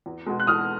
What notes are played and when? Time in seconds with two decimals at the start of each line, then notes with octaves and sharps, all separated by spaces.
0.06 E2
0.26 B2 G#3
0.40 F#6
0.47 E2 D#6 F6